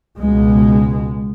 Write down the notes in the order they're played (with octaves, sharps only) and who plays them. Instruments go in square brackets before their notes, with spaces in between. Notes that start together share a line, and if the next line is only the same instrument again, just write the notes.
[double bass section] C#2 B2 G#3